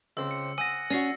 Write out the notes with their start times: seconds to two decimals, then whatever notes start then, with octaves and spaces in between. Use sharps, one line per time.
0.17 C#2 C4 C6 E6
0.31 C#7
0.58 D#5 F#5 G#5 E6 A#6
0.90 C#4 F#4 D5 C7